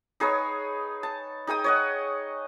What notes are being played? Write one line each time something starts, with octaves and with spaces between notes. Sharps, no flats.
D#4 G#4 B4 C#5
A5
D#4 G#4 G5 D#6
C#5 D#5 F#5